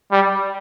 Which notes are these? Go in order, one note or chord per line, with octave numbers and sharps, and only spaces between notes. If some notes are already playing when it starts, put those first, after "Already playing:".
G3